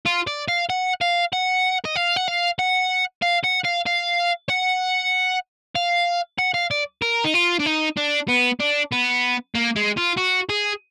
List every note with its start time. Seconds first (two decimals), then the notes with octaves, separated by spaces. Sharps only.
0.06 F4
0.27 D5
0.48 F5
0.70 F#5
1.01 F5
1.33 F#5
1.85 D#5
1.96 F5
2.17 F#5
2.28 F5
2.59 F#5
3.22 F5
3.44 F#5
3.64 F5
3.86 F5
4.49 F#5
5.76 F5
6.39 F#5
6.54 F5
6.71 D5
7.02 A#4
7.24 D#4
7.34 F4
7.59 D4
7.66 D#4
7.97 D4
8.28 B3
8.60 D4
8.92 B3
9.55 A#3
9.76 G#3
9.97 F4
10.17 F#4
10.49 G#4